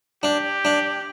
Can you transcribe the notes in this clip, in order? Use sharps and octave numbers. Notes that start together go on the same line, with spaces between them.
D4 G4
D4